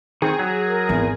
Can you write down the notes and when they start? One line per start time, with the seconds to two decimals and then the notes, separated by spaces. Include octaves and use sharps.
0.22 D#3 C4 G#4
0.39 F#3
0.64 A#4
0.89 G#1 E2